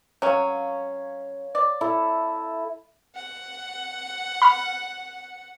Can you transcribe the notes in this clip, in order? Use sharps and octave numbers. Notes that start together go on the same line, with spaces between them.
F#3 C#4 C#5 F5
D5
E4 A4 E5
F#5
B5 F6